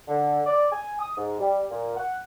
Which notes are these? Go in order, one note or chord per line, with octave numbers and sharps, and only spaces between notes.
D3
D5
G#5
D#6
G#2
G3
A#2
F#5